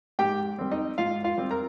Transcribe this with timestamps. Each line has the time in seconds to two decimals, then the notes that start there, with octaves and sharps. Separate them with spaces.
0.19 G#2 G4 G5
0.58 G3 C4
0.71 D#4 D#5
0.98 G#2 F4 F5
1.24 F4 F5
1.38 G3 C4
1.51 A#4 A#5